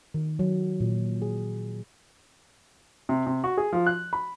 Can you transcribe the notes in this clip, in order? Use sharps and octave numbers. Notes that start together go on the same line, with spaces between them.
D#3
F#3
A#2
G#4
C3
C3
F#4
G#4
F3
F#6
B5